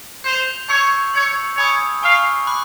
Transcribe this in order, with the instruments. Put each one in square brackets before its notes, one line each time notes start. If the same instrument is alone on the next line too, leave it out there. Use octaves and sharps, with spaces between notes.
[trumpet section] C5 [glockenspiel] G6 C7 F7
[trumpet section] C#5 [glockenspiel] A5 C#6 E6 G6 C7
[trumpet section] C#5 [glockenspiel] E6 G#6 C#7 F#7
[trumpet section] C#5 [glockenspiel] G#5 B5 D#6 G#6 C#7
[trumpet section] F5 [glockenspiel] G#5 C#6 F6
[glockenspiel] B5 D6 F#6